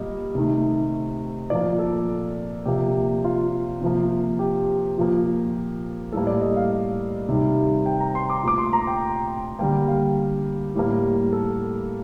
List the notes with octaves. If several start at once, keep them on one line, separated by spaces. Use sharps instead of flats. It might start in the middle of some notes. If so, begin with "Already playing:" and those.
Already playing: A#2 G3 A#3 D#5
C3 D#3 A3
A#2 F3 A#3 D5
A4
C3 F3 A#3 G4
F4
C3 F3 A#3
G4
A#2 F3 A#3
A2 G3 A#3 A4
D5
D#5
F5
C3 D#3 G3
G5
A#5
C6
D6
A#2 A3 D6
C6
A#5
G5
D3 G3 A#3 G5
F5
A2 G3 A#3
A4